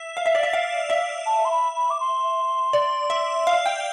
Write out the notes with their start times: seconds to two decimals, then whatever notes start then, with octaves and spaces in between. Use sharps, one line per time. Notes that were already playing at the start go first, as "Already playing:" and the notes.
Already playing: E5
0.17 F5
0.26 E5
0.35 D5
0.43 E5
0.53 F5
0.90 E5
1.26 A5
1.45 C6
1.51 B5
1.76 B5
1.90 D6
2.00 C6
2.73 D5
3.10 E5
3.47 F5
3.66 G5